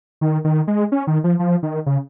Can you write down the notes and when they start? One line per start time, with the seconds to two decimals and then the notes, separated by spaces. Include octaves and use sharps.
0.21 D#3
0.44 D#3
0.68 G#3
0.92 C#4
1.07 D#3
1.24 F3
1.39 F3
1.63 D#3
1.86 C#3